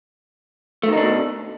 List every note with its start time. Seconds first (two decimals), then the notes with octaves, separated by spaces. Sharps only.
0.83 A3
0.88 D#3
0.93 D#4
0.97 D4
1.02 B2